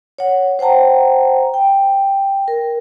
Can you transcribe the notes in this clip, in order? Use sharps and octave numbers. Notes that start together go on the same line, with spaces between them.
C#5 F#5
C5 F#5 G5 A5 A#5
G5
A#4